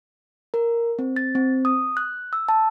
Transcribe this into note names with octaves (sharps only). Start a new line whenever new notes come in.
A#4
C4
A6
C4
D#6
F#6
E6
A5